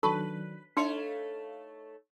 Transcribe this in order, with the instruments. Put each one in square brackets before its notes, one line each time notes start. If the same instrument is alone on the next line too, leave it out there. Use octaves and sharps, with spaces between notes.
[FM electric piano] D#3 F#3 D4 [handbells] A4 [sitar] B4 [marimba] A5 B5 C#6
[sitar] A3 D#4 C#5 [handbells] D4 C6 C#7 [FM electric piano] F5